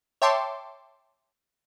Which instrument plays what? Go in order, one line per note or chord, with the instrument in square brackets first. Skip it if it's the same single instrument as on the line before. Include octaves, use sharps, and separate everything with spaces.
[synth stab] C#5 E5 G5 A5 C6 D6